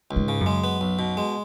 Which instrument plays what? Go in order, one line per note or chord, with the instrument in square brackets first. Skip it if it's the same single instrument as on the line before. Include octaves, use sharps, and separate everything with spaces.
[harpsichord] C#2
[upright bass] G#2
[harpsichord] C#3
[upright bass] F#2
[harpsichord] G#3
B3
B1
B2
G#3